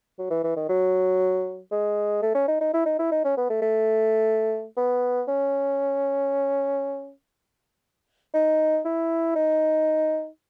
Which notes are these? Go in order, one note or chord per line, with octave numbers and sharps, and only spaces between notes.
F#3
E3
E3
D#3
F#3
G#3
A3
C#4
D#4
D#4
E4
D#4
E4
D#4
C#4
B3
A3
A3
B3
C#4
D#4
E4
D#4